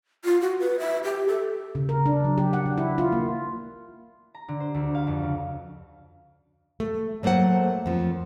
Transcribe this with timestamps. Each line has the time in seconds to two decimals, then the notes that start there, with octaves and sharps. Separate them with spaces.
0.25 F4
0.41 F#4
0.60 B4
0.79 E5
1.04 G4
1.28 A4
1.75 C#3
1.89 A#4
2.06 D4
2.24 F#3
2.38 G4
2.53 F#5
2.66 D4
2.78 E4
2.98 F4
3.12 A#3
4.35 A#5
4.48 D3
4.60 C5
4.74 D2
4.95 F5
5.07 F2
5.23 C#3
6.80 A3
7.23 F#3 A3 A#3 C5 F#5
7.86 F2 F3